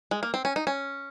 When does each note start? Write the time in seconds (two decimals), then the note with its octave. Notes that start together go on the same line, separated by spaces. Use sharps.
0.11 G#3
0.23 A#3
0.34 C4
0.45 C#4
0.56 D#4
0.67 C#4